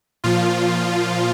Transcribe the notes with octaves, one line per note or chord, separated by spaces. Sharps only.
A#2 F3 F4